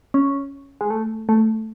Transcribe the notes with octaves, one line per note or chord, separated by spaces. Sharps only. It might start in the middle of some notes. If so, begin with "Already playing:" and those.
C#4
G#3
A3
A3